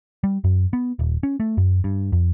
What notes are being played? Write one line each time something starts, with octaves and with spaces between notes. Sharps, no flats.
G3
F#2
B3
D#1
C#4
A3
F#2
G2
F2